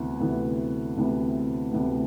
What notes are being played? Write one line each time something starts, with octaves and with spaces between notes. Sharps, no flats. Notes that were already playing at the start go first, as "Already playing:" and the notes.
Already playing: D2 C3 E3 B3
D2 C3 E3 B3
D2 C3 E3 B3
D2 C3 E3 B3